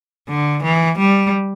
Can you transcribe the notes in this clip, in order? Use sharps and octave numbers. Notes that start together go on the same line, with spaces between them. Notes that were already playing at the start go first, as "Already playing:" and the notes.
D3
E3
G3